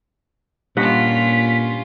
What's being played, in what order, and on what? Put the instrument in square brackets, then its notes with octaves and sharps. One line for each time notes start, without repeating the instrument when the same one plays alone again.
[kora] G2 D#5 F#5 [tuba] A#2 [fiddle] C#4 F4 [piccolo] B6